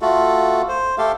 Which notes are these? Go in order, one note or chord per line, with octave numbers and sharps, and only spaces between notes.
A3 F4 F#4 A4
C5
A3 G4 A4 F5